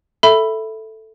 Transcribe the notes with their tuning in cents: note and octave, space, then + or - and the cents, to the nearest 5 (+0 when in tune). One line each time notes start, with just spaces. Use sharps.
A4 +0 E5 +0 B5 +0